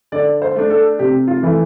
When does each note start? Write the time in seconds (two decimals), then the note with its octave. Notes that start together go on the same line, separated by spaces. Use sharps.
0.12 D3 D5
0.42 C5
0.56 A3 D4
0.70 A4
0.99 C3 G4
1.28 F4
1.43 E3 A3 E4